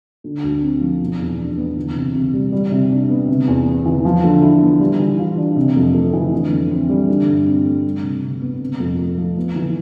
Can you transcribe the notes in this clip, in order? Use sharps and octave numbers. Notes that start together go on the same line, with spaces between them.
D3
D2
C4
F3
B2
E2
D4
B3
E3
C3
C3
G3
G3
C3
D4
B3
C3
E2
B3
E3
F3
D3
E4
B3
G3
E3
F4
D4
C3
F2
A3
E3
D3
F2
C4
G3
D3
G2
C4
A3
G3
C3
C3
B3
C3
F2
A3
F3
B3
E3